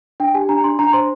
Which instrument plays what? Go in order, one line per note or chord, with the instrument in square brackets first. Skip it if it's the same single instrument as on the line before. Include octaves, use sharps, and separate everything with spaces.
[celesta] D4 G5
G4 G#5
D4 A#5
D4 C6
D4 A#5
C5 C6